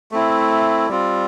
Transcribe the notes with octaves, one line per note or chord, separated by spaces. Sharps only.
A3 C4 E4
G3 C4 F4